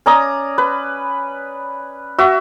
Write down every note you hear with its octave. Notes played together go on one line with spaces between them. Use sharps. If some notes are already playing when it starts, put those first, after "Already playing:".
C#4 D5 A#5 D#6
B4
F#4 E5